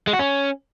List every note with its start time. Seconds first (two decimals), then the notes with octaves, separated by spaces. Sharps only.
0.07 G#3
0.13 F#4
0.19 C#4